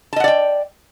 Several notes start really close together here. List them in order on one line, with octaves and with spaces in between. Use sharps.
A5 D#5 F#5 D5 G5